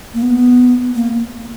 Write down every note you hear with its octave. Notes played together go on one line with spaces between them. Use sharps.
A#3
B3
A#3